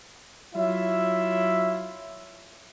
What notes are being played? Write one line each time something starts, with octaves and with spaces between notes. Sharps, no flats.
F#3 E4 F4 C#5 E5